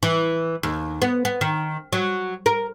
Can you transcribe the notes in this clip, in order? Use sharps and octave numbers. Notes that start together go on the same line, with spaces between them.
E3
D#2
B3
B3
D#3
F#3
A#4